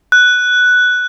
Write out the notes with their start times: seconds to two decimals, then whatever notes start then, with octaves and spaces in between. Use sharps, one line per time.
0.12 F#6